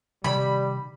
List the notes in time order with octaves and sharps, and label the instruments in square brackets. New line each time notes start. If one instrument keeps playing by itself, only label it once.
[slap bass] C3 D#3 [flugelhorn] G3 [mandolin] B5